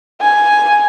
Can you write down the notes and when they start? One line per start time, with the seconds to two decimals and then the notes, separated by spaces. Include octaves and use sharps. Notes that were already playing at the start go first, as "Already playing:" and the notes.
0.21 G#5